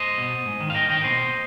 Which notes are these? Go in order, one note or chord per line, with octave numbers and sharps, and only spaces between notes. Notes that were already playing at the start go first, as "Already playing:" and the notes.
Already playing: C5 D#5
B2
G#2
D#3
F5
G#2 D#5 G5
D#3 D#5 G5
B2 C5 D#5